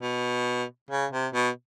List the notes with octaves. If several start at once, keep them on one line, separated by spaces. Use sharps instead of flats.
B2
C#3
C3
B2